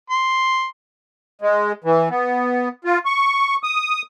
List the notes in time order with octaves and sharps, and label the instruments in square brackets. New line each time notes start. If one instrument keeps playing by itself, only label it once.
[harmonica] C6
[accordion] G#3
E3
B3
F4
C#6
D#6